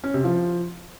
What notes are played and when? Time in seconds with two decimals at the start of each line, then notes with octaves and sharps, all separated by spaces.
0.04 C#4
0.14 C3
0.24 F3